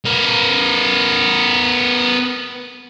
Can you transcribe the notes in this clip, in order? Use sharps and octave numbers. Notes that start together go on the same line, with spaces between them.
B3 A#4